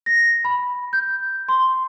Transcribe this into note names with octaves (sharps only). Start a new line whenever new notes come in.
A#6
B5
G6
C6